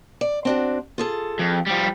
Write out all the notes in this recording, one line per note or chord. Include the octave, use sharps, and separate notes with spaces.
D5
C4 D4 F#4
F4 G#4 A4
F2
F3 G3